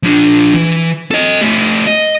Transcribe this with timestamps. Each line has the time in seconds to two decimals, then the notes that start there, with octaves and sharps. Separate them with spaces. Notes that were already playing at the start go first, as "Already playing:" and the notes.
0.03 F3 D4
0.54 E3
1.11 A4 D#5
1.41 A3 G4
1.87 D#5